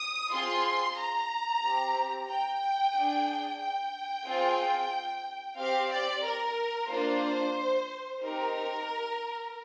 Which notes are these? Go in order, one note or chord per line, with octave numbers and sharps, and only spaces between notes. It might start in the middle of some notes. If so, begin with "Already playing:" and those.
Already playing: D#6
C4 F4 G#4 C6
A#5
C4 G4
G5
D4 G#4
G5
C4 F4 G#4
C4 G4 F5
D5
A#4
A#3 D4 F4 C5
C4 D#4 G4 A#4